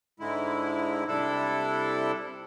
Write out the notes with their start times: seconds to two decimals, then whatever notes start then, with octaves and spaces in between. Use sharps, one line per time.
0.20 G#2 D3 G#3 E4
1.08 C3 G3 D4 E4 A4